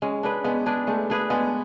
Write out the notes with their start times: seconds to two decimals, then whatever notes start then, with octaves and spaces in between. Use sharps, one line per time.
0.02 G#3 C#4
0.23 D4 G#4 B4
0.44 G#3 B3
0.66 D4 G#4 B4
0.87 G#3 A3
1.10 D4 G#4 B4
1.30 G#3 B3